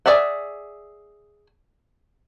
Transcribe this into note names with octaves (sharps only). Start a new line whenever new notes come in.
G#4 C5 D5 E5 F#5